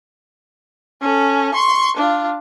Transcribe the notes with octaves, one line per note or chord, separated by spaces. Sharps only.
C#4 A4
C6 C#6
D4 F4